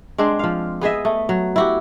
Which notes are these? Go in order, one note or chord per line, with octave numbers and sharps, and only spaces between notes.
G#3 C4 D4
F3 F5
B3 G#4 D#5 E5
A3
F#3
E4 F#4 G4